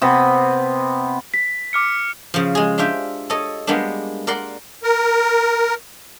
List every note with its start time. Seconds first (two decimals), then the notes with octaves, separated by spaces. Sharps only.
0.02 C3 B3
1.34 B6
1.73 D6 F6 C#7
2.34 C#3 F3
2.55 G#3 G#4
2.78 D4 F4 G4 E5 G5
3.30 A4 C#5 D#5
3.67 G3 G#3 A#3 B3 D4
4.27 A#4 D5 F#5 C6
4.83 A#4